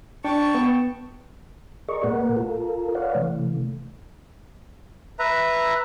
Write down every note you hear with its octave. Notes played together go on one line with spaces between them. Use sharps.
D4 G5 A5 C#6
B3
G#4 A#4 D5 D#5 C#6
A#2 A3 A#3 A#4 B4 F#5
F4 A4 A#4
B4 C#5 D5 F5 F#5
C3 E3 A3
B4 E5 A#5